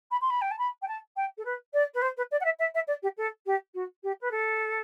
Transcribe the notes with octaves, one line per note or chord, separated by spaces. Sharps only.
B5
C6
B5
G5
A5
B5
G5
A5
G5
A4
B4
D5
B4
C5
B4
D5
F#5
E5
E5
E5
D5
G4
A4
G4
F#4
G4
B4
A4